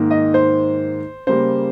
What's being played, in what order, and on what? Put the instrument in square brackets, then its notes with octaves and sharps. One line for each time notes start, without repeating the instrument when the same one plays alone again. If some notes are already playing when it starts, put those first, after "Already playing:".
Already playing: [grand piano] G#2 D#3 A#3
D#5
C5
C#3 G3 A#3 C5